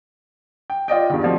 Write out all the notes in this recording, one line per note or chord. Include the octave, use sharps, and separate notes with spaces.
G5
F4 D5 D#5 G5
E2 G2 D#3
F3 A3 C4 F#4 D5